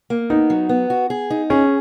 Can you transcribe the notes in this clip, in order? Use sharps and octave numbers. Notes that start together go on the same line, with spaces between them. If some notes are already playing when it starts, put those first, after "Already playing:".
A#3
B3 D#4
F#3
B3
F#4
G#4
D#4
C#4 G#4